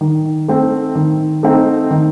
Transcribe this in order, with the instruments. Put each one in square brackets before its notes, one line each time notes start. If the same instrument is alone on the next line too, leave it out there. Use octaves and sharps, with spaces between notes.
[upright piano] D#3
A3 C4 D#4
D#3
A3 C4 D#4
D#3